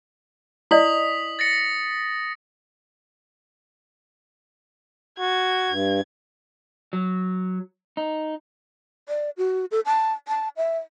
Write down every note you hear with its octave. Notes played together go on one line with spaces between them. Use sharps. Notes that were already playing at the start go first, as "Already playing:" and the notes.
E4 D5 D#5 D#6 B6 F#7
A6 A#6 C#7
F#4 G#6
G2
F#3
D#4
D5
F#4
A4
A5
A5
E5